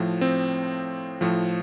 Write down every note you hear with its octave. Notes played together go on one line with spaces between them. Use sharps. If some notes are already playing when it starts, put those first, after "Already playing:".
Already playing: A2 F3
C4
A2 F3